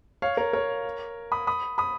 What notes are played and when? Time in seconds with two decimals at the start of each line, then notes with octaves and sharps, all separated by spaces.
0.22 C#5 F5
0.37 A#4 C#5
0.53 A#4 C#5
1.32 B5 D#6
1.47 B5 D#6
1.78 B5 D#6